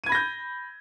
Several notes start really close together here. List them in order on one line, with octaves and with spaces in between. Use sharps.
D#7 G#6 B5 A#6 G6